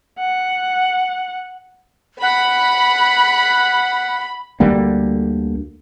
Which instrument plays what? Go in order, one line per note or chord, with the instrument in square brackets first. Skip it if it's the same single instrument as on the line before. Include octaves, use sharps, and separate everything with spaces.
[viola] F#5
[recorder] F#5 [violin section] B5
[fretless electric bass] D2 D3 G3 A#3